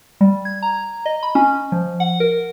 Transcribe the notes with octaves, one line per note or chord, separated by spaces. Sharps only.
G3
G#6
A#5
D#5
B5
C#4
F3
F#5
A#4